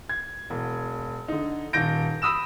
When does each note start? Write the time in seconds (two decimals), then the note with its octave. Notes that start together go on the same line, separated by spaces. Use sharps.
0.09 G#6
0.50 E1
1.28 D3 D#4
1.73 D#1 D#3 G6 A#6 D7
2.22 B5 D#6 E6 E7